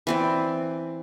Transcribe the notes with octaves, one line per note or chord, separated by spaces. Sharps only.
E3 C4 D5